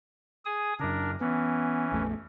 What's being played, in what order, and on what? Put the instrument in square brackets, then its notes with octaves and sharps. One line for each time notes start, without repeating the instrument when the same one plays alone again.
[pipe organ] G#4 G#5 D#6
[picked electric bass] F#2 C#3 [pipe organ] D4 A#4
[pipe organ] E3 C#4 [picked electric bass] B3
[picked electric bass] A#1 F2 A3